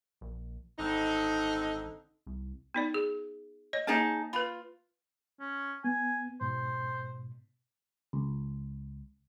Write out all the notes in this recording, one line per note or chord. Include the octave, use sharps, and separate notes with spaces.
A#1
G#1 D3 C4 D#4
C2
B3 D#4 D5
G#4
C#5 D#5
A#3 D#4 G#4 A5
F4 B4 B5
C#4
B3 G#5
G#2 B2 C5
C#2